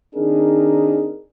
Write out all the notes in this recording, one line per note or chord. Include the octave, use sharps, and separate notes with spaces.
D#3 C4 D4 D#4 G#4 A#4